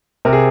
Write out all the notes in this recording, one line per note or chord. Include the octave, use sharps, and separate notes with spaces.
C3 A#4
G#4